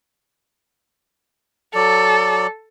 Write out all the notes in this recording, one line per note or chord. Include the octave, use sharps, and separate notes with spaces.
F#3 A4 D5